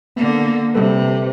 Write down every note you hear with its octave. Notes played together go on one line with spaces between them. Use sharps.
D3 A#3 B3
C3 G3 A4 B4